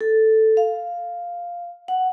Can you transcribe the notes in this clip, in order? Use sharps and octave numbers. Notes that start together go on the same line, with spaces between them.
A4
F5
F#5